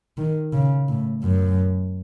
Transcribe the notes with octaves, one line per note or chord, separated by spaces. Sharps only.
D#3
C#3
A2
F#2